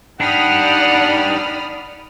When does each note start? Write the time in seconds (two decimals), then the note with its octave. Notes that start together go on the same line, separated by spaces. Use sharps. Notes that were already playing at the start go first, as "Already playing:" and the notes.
0.20 D4 D#4 G4 D5 F#5 B5 D#6 F6